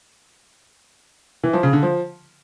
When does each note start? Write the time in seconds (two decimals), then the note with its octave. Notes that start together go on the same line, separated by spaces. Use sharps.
1.43 E3
1.53 F3
1.63 C#3
1.73 D3
1.83 F3